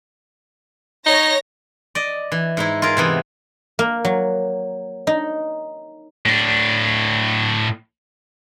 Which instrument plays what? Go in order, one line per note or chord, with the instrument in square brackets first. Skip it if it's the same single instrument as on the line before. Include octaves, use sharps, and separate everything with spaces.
[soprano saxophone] D#4 [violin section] C#5 A#6
[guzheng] D5 D#5
E3
G#2 D#4 E4
F4 G#4 A#4
C3 E3 B3
A#3
F#3
D#4
[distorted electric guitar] A2 D4